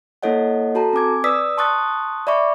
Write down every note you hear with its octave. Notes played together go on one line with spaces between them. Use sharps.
A#3 E4 A4 C#5 D#5 F#5
F#4 A4 A5 A#5
C4 G#5 D6 G#6
B4 D5 D#6 E6 B6
A5 C6 C#6 D#6 F#6 A6
D5 E5 B5 C#6 D6